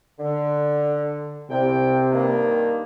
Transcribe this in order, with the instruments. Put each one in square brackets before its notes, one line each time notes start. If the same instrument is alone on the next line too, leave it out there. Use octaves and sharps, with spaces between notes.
[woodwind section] D3
[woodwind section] C2 G5 [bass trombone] C3
[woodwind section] G2 D#3 A#3